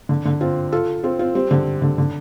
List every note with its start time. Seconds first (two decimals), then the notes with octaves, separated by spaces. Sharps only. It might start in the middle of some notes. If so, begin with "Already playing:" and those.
0.09 D3
0.25 D3
0.41 C4 F4
0.72 F4 A4
1.04 C4 F4
1.19 C4 F4
1.35 G3 C4
1.51 D3 G3
1.82 D3
1.98 D3